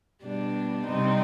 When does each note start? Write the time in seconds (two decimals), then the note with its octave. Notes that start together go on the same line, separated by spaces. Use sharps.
0.24 B2 G3 D4
0.87 C3 G3 C4 D#4